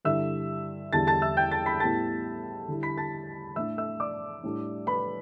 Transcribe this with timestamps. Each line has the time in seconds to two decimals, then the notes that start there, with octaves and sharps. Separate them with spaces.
0.05 G2 D3 G3 E4 E5 E6
0.93 E2 D3 G3 D4 A5 A6
1.07 A5 A6
1.22 E5 E6
1.37 G5 G6
1.51 A5 A6
1.66 B5 B6
1.80 A2 G3 B3 E4 A5 A6
2.68 D3 G3 E4
2.83 B5 B6
2.97 A5 A6
3.56 A2 A3 D4 E5 E6
3.78 E5 E6
4.00 D5 D6
4.44 A2 G3 D4
4.87 B4 B5